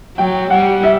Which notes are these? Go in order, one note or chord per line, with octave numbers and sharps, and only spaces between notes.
F#3 G5
G3 F#5
E5